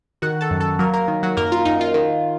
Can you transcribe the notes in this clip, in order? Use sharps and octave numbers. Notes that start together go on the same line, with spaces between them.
D#3 F#4 F#5
A4 A5
F#2
A4 A5
F#3 A#3 A#4
A#3 A#4
D#3
F#3 F#4
F#2 A#3 A#4
F4
F#2 D#4
F4
D#3